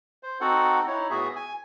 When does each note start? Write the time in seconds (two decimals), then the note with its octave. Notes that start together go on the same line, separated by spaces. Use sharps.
0.23 C5
0.41 C4 D#4 F#4 A4 F#5
0.87 D#4 E4 C#5
1.10 A2 B3 F#4 G#4 E5
1.36 G#5